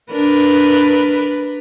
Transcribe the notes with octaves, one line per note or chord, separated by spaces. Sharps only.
D4 A#4 B4